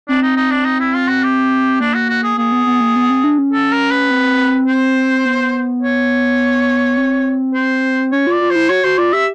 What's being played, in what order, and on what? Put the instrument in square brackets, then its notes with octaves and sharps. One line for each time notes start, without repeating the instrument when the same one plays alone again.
[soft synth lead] C4 [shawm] D4
[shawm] D#4
D#4
D4
D#4
E4
F4
F#4
G4
[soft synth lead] A#3 [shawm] D4
[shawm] F#4
F#4
G#4
[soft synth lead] A#3 [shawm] G#4
[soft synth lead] B3
B3
A#3
B3
C4
D4
C#4
[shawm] A4
A#4
B4
[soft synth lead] C4
[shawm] C5
[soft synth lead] B3
[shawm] C#5
[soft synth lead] C4
[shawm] C5
[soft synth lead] C#4 [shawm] C#5
[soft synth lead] F4 [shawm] D5
[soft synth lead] F4
[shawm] C5
[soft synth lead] E4
[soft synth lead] F#4 [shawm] C#5
[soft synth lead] F#4 [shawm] C5
[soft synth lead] F4 [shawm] D5
[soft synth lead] G4 [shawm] E5